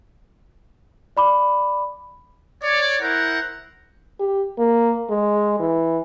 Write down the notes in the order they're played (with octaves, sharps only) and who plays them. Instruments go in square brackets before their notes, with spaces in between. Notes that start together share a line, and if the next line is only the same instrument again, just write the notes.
[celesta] D5 B5 D6
[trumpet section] C#5 D5
E4 A#4 C5 F#5
[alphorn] G4
A#3
G#3
E3